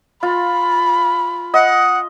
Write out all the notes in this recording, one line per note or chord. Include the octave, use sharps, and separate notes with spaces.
F4 B5
D#5 F#5